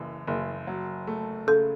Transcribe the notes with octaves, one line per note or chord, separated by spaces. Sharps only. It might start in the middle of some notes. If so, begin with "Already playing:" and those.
Already playing: F#1 F#2 E3
F#1
F#3
A3
C#3 A4